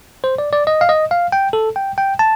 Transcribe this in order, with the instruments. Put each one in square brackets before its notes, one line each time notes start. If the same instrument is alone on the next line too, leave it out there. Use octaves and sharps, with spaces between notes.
[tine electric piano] C5
D5
D5
D#5
F5
D#5
F5
G5
A4
G5
G5
A5